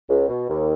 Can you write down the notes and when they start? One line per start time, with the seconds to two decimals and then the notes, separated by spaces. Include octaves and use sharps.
0.09 C#2
0.29 B2
0.48 D#2